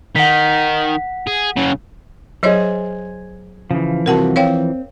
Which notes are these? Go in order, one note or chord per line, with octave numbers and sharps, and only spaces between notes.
D#3 F#5 B6
G#4
C#3 F#3
F#3 G#4 C5 C#5 D#5
C#3 E3 F3
C2 C3 F#4 A#4 F#5 A5
C4 C#5 F5 G5